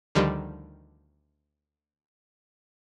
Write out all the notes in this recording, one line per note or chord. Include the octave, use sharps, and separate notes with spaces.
D2 D3 D#3 F3 G3